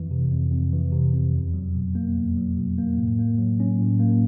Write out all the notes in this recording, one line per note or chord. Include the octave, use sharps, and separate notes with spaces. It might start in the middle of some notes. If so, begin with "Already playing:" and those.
Already playing: F2 E3
C3
F2
F2
E3
C3
F2
E2
F#3
B2
A#3
E2
F#3
B2
A#3
A2
A#3
F#3
C#4
A2
A#3